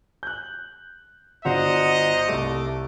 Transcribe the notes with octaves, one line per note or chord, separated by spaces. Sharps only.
F#6 G6
G1 D4 F#4 C5 D#5 F#5 A#5
C2 G3 A3 D6